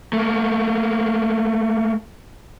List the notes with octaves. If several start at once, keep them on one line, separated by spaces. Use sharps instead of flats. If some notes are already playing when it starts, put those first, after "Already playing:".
A3 A#3